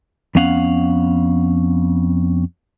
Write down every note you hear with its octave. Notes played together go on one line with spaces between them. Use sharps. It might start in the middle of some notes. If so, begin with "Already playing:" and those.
F2 B3 C#4 F5 F#5